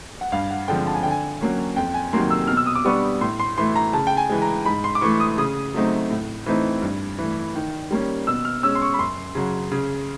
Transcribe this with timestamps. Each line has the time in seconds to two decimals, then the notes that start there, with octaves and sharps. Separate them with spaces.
0.21 F#5
0.32 G2 F5
0.50 F#5
0.68 D3 F3 G#3 C4 G5
0.87 A5
0.95 G#5
1.03 D3 G5
1.11 G#5
1.41 F#3 A#3 C#4
1.76 F2 G5
1.94 G#5
2.13 C3 D#3 F#3 A#3 C6
2.30 E6
2.47 B2 F6
2.57 E6
2.66 D#6
2.75 D6
2.85 G3 B3 D4 C#6
3.21 A2 C6
3.40 C6
3.58 E3 A3 C6
3.76 A#5
3.93 C#3 A5
4.07 G5
4.17 G#5
4.29 E3 G#3
4.42 A#5
4.65 G#2 B5
4.84 C6
4.95 D6
5.01 E3 A3 C#6
5.20 D#6
5.38 C#3 D#6
5.74 F#3 A3 C4 D#4
6.11 A2
6.46 E3 A3 C4 D#4
6.82 G2
7.18 E3 A3
7.55 D#3
7.91 G3 A#3 C#4
8.27 B2 E6
8.45 F6
8.63 G#3 C#4 E6
8.75 C6
8.82 C#6
8.94 B5
8.99 F#2 C6
9.35 C#3 F#3
9.72 C#3